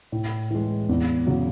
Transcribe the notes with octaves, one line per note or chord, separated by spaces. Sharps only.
A2
E3 G#3
E2
C#3 F#3